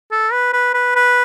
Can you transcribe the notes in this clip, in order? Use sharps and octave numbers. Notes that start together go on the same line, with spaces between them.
A4
B4
B4
B4
B4